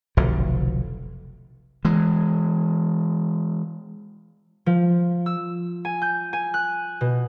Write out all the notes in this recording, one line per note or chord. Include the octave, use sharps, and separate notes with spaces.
F1 B1 D3
E3 G#3
F3
E6
G#5
G6
G#5
F#6
B2